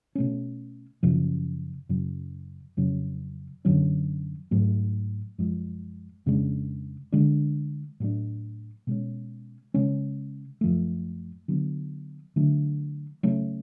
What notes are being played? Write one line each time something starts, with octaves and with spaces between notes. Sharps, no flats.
B2 A3 C#4
F#2 C#3 F3
F#2 C#3 F#3
F2 C#3 F#3 C#4
F#2 D3 F#3 C#4
G#2 F#3 A3
F#2 F3 G#3
F2 C#3 G#3 D4
D3 G#3 D4
A2 F#3 A3 D4
B2 G#3 C#4
C#3 G#3 C#4
F#2 F3 A3
D3 F#3 B3
D3 F#3 A3 D4
C#3 F#3 A3 C#4